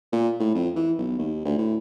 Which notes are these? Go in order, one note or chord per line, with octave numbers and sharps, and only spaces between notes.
A#2
A2
F2
E3
B1
D#2
D2
A2